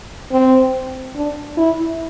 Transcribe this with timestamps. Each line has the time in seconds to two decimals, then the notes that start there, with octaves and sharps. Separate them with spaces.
0.32 C4
1.16 D4
1.57 E4